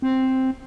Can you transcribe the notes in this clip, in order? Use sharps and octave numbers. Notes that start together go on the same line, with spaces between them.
C4